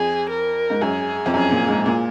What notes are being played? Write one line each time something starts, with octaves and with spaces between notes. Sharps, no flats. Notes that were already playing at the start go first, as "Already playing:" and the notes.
Already playing: F2 G#4
A#4
G#2
F#2 G#4
F2
F#2 G#4
A#2
G#2
A#2